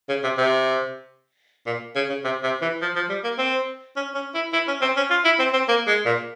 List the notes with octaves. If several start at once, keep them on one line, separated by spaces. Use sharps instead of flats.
C#3
C3
C3
A#2
C#3
C#3
C3
C3
E3
F3
F3
G3
A#3
C4
C#4
C#4
E4
E4
C#4
C4
C#4
F4
E4
C4
C4
A#3
G#3
A#2